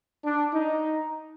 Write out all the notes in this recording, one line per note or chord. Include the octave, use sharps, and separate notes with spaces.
D4
D#4